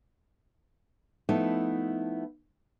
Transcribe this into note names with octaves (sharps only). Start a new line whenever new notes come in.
F3 A3 B3 D#4 E4